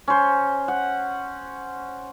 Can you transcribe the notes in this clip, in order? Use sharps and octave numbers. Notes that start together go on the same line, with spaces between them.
C#4 C5
F#5